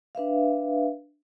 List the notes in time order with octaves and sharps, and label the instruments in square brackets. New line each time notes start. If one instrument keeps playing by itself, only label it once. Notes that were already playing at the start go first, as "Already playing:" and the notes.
[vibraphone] D4 B4 E5 F5